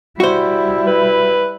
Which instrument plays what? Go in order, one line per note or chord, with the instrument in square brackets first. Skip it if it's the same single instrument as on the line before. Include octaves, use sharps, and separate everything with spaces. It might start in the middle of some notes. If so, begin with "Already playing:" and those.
[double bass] G3 E4 [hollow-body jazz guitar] F#4 C5
[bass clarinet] B4